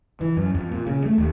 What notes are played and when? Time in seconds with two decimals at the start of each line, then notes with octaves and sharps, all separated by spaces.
0.21 E3
0.37 F#2
0.55 F2
0.71 A#2
0.87 C#3
1.06 A3
1.18 D#2